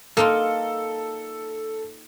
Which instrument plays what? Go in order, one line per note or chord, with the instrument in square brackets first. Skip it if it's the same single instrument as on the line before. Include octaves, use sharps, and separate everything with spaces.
[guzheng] A#3 D#4 F4 [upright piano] A4